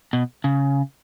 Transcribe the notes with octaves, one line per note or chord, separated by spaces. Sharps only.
B2
C#3